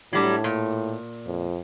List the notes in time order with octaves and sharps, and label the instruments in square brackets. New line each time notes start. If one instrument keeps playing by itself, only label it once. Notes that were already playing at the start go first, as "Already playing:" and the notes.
[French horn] A2 [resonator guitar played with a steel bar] F#3 G3 D4
[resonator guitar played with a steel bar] A#2
[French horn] F2